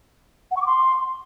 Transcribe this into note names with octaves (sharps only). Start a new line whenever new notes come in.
F#5
C#6
D6
C6